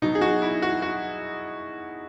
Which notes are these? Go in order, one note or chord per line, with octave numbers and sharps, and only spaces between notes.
B2 F#3 D#4
G#4
F#4
E4
F#4
F#4